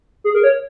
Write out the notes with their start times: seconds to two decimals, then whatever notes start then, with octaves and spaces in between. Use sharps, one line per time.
0.24 G#4
0.35 A#4
0.44 C#5